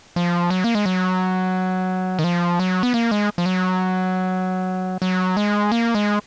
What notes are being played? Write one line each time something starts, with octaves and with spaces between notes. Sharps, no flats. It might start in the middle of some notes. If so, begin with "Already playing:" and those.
F3
F#3
A#3
G#3
F#3
D#3
F3
F#3
B3
A#3
G#3
F3
F#3
F#3
G#3
A#3
G#3